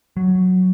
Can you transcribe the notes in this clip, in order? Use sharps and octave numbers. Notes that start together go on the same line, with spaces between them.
F#3